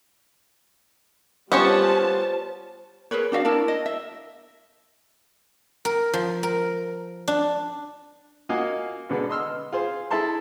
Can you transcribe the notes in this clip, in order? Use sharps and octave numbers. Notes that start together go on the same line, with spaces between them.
G3 B3 C#4 F4 G4 C5 C#5 A5
G#4 A#4 B4 C#5
D4 F#4 E5 F5
D4 E4 A#4 A5
D#5
E5
A#4
F3
A#4
D4
A#3 F4 F#4 D#5 F5 G#5
B2 D3 G#3 B3
D#5 C6 E6 F6
F4 G#4 C5
E4 G#4 A4 E5 A5 C6